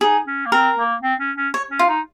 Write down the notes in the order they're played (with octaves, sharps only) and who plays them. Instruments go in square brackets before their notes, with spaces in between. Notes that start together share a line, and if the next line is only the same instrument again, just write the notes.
[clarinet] D#4 [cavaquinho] G#4
[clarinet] C#4
A#3
[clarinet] C4 [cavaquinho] A#4
[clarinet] A#3
C4
C#4
C#4
[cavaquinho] C#5
[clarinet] C#4
[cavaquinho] F4
[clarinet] D#4